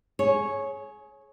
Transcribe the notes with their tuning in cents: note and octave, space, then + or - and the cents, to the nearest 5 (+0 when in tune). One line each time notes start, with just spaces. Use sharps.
G#4 +25 C#5 -10